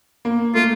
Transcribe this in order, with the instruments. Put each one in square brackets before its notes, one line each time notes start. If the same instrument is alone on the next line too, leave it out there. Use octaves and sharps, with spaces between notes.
[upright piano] A#3
[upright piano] A3 [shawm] F4